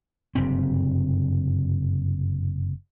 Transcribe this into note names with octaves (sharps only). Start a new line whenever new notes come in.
F#1 G2 C3 C4